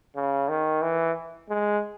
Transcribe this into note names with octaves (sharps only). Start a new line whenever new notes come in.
C#3
D#3
E3
G#3